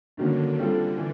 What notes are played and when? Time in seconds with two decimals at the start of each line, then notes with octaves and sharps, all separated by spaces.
0.17 G2 D3 D#3 F#3 A#3 C#4
0.58 G3 C4 F4 A4
0.98 E3